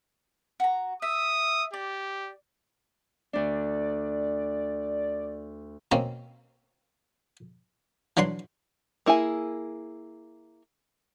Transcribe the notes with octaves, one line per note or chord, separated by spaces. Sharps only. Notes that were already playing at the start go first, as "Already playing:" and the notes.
F#4 A#5
E5 D#6
G4 D5
D2 D4 D5
B2 A#3 C4 C#4
E3 F#3 D4 F#5 C6
A#3 E4 G#4 G#5